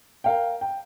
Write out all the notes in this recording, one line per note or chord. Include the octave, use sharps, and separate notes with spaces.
A#4 F5 G5
G5